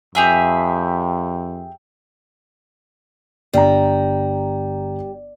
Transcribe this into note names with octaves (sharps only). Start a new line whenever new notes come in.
F2 G4 G#4 E5
G1 G3 A#5